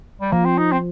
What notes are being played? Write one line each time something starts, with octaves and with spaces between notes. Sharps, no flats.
G3
F3 A#3
C4
D#4
C4